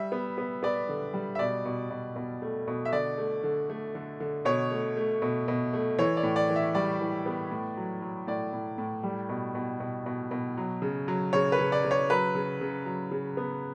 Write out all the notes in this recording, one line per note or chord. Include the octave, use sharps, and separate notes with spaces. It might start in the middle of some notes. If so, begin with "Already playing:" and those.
Already playing: G3 E5
B3
B3
B3 D5
D3
G3
E5
B2 D5
B2
B2
B2
A3
B2
E5
D3 D5
A3
D3
A3
D3
D3
B2 C#5
A3
A3
B2
B2
A3
E3 C#5
D5
A2
D5
E3
E5
G3 D5
E3
B3
A2
F#3
F#3
A2 D5
A2
A2
G3
B2
B2
B2
B2
B2
F#3
C#3
F#3
C#3 C#5
B4
C#3
D5
C#3
C#5
F#3 B4
C#3
C#3
F#3
C#3
B3